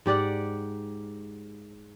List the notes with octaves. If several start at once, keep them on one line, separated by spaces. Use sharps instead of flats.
G#2 G4 D5 F#5